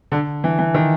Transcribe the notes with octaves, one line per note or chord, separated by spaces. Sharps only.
D3
E3
E3
D#3